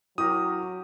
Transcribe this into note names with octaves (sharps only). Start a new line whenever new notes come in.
F#3 C#4 E4 G4 A#4 D#6